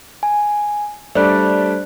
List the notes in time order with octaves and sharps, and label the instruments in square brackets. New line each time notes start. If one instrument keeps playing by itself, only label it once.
[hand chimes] G#5
[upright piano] G3 A3 D4 [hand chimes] C5 D5 F#6